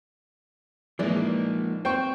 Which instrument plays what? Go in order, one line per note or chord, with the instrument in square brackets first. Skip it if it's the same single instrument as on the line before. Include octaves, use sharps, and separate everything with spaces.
[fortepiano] E3 D5 [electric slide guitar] F3 A#3 [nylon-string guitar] G#3 D#4
[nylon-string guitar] C4 [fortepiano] C5 G5 C#6